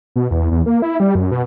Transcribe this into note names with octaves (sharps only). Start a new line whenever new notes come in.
B2
E2
E2
A#3
E4
G3
F#2
B2